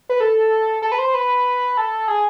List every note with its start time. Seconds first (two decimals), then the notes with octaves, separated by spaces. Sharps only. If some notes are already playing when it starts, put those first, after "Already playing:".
0.09 B4
0.20 A4
0.82 A4
0.92 B4
0.98 C5
1.14 B4
1.77 A4
2.08 G#4